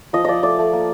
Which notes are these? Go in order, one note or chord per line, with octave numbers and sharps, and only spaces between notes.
F3 D#5
F3 D5 D#5
A3 D5
A3
A#3